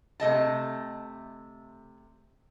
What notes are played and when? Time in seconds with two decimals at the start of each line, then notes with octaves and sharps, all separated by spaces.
0.20 C3 A3 D#5 A5